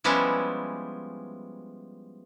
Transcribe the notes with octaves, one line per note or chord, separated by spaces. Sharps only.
F3 G3 G#3 B3 C#4 E4